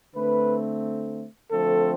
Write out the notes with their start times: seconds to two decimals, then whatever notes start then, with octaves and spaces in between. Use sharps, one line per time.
0.15 D3 A3 C4 B4
1.51 D3 F3 A3 C4 A4